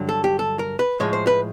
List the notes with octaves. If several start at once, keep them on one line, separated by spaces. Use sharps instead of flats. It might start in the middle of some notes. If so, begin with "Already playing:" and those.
Already playing: G2 D3 F#3
A4
G4
A4
A#4
B4
A2 F3 G#3 C#5
C5
B4